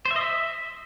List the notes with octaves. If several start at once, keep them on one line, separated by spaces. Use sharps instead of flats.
C5
E5
D#5
E5